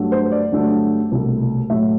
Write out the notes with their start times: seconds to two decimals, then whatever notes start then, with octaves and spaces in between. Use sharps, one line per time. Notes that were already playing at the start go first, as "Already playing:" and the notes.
Already playing: G2 F#3 A3
0.12 C5
0.32 D5
0.52 G2 D3 F#3 A3
1.12 C2 B2 A3
1.70 A2 F#3 A3 E5